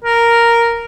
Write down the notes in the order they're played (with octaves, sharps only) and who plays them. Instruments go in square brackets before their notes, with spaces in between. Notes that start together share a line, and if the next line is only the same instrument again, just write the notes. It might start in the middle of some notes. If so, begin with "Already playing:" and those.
[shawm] A#4